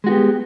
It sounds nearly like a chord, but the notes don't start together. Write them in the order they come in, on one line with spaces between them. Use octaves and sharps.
G#3 F#4 B3 G4